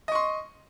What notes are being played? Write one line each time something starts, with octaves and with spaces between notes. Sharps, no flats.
D#5 C6 C#6